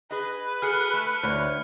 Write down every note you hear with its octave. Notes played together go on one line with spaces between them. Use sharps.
G#4 B4 D#5
F#4 G#4 A4 F6 C#7
A3
D2 C#5